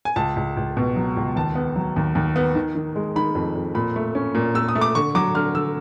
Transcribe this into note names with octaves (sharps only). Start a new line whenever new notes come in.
G#5
C#2 A5
C#2
C#2
B2
F#3
C#2
D#2 A5
B3
F#3
D#2
D#2
B3
D#3
D#3
G#3
D#3 B5
F2
F2
A#2 B5
A3
C#4
A#2
A#2 E6
D#6
A3
D6
D3 C#6
F#3 D6
D3 F6
D3 E6